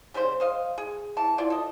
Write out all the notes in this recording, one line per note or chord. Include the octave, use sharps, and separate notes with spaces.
C#3 G3 G4 C5
C5 D#5 F5
G#4
E3 A5
E4 F4 D5
A4 D#5